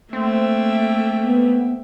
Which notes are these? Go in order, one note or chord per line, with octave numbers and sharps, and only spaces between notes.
A3 A#3 C4 E5 G5
B3